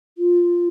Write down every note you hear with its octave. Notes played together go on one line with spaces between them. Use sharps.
F4